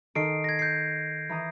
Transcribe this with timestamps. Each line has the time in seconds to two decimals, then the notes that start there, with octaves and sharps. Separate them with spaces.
0.15 D#3 A4 D#6 C7 D7
0.44 G#6 A#6
0.59 G6 C7
1.29 E3 A#5 D#6